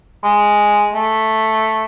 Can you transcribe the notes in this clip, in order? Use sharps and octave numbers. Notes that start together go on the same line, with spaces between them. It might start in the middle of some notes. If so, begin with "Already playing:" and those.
G#3
A3